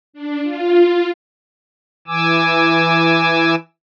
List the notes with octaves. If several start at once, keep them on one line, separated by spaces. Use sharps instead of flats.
D4
F4
E3 G#5 D6 E6